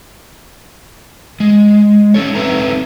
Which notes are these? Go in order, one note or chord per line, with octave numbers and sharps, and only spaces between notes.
G#3
C#4 D#4 A4 C#5
C4 D#4 A4 B4 E5 A#5